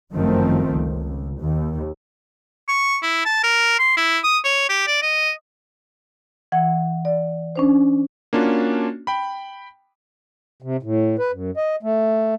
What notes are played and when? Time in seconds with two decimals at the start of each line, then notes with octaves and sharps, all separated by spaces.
0.12 G1 F#2 D#3 F3 A3 C4
0.71 C#2
1.40 D#2
2.68 C#6
3.03 E4
3.25 A5
3.44 A#4
3.79 C6
3.97 E4
4.24 D#6
4.45 C#5
4.69 G4
4.87 D5
5.02 D#5
6.52 E3 F#5
7.05 D5
7.56 C#4 D4 C5
8.33 A#3 C#4 D4 F4 F#4
9.07 G5 B5
10.62 C3
10.83 A2
11.19 B4
11.32 F#2
11.57 D#5
11.83 A3